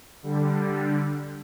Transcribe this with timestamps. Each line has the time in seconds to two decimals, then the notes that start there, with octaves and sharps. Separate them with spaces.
0.23 D3 G3